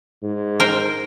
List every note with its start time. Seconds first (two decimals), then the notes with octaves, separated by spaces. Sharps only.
0.23 G#2
0.60 A#4 C5 G5